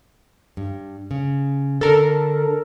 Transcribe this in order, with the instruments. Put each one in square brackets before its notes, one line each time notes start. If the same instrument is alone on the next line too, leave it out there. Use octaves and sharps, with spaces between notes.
[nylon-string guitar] G2
C#3
[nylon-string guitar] D3 D4 [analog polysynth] A4 A#4